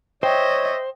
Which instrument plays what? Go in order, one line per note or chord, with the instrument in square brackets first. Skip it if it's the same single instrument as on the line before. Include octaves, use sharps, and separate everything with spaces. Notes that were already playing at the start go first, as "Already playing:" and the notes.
[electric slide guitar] C5 [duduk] C#5 [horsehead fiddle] D#5 E5 [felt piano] G5